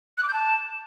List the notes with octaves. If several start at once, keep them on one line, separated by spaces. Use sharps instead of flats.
F#6
D6
G6
A5